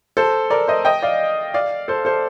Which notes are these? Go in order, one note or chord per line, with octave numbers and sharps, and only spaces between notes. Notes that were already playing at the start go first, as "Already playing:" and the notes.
A4 C5
A#4 D5
C5 D#5
D#5 G5
D5 F5
D5 F5
A4 C5
A4 C5